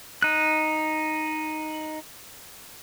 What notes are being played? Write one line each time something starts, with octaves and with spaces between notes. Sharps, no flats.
D#4 F#6